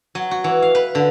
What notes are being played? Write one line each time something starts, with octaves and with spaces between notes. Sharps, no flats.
F#3
F#4
E3
F5
B4
D3